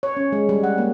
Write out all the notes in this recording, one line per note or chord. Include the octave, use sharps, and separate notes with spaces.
C#5
C#4
G#3
G3
F#5
A#3